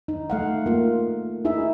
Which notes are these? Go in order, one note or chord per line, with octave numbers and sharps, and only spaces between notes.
D#4
A3 F5 F#5
A#3 F4
D#4 E4 G#4 E5